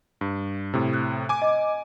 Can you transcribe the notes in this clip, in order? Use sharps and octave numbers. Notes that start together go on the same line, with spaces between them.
G2
A2 C3
F#6
G#5 D6
D#5